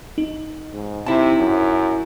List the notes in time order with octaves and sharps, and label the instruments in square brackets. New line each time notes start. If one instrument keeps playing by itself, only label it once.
[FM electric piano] D#4
[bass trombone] G#2
[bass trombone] C3 [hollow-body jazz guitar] E4 A5
[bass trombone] F#2